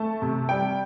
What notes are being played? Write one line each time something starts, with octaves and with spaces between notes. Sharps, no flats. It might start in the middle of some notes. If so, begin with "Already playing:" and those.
Already playing: A3 A5
C3
G3 G5